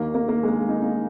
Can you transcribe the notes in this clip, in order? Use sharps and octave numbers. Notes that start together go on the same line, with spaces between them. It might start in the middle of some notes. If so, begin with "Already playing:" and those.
Already playing: D#2 D#3 A#3
A#3
A#3
G#3
A#3
D#4
D#4